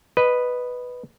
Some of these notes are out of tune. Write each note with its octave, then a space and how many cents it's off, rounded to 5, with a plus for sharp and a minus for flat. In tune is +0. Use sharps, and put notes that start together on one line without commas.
B4 +0 D#5 -10